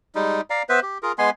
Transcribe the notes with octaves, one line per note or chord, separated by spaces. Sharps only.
G3 G#3 D#4
D5 F5 A#5
B3 B4 C5 E5
G4
F4 G#4 A#4
G#3 B3 G#5 C6